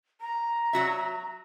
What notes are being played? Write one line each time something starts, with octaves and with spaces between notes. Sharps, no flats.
A#5
F#3 F#4 E5